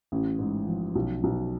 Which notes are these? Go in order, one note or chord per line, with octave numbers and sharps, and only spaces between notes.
A1
G#2
F3
B1
B1